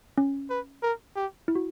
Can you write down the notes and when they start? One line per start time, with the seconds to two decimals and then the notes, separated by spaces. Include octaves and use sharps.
0.18 C#4
0.50 B4
0.83 A#4
1.16 G4
1.48 E4
1.55 F#4